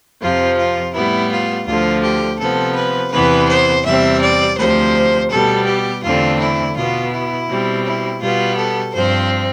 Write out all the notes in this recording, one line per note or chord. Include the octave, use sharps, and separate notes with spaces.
F2 C3 F3 F4
F4
A2 G3 B3 E4
F4
D2 D3 F3 F4
G4
C3 F3 B3 A4
B4
E2 C3 E3 B3 B4
C5
E2 C3 G3 C4 E5
D5
D2 C3 F3 C5
B2 G3 B3 A4
G4
E2 D3 A3 C4 F4
E4
B2 B3 F4
E4
B2 G3 C4
E4
B2 G3 B3 F4
A4
G2 F3 C4 C5